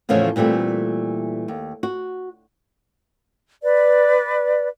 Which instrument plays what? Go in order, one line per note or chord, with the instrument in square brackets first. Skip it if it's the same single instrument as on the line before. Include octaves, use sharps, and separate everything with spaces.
[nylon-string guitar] E2 A2 C#3 E3 F3 A3
A#2 E3 G3 A3 C4
D#2
F#4
[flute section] B4 D5